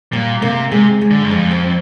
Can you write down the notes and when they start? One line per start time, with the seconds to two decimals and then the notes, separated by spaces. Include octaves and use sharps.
0.13 A#2 G3
0.42 C3 A#3
0.72 C3 G#3
1.01 G#3
1.11 D3
1.23 G2
1.31 F2 G#3
1.51 C4